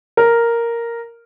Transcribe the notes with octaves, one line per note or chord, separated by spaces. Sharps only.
A#4